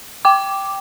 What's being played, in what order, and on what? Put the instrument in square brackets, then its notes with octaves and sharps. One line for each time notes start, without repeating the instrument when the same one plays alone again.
[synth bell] G5 D6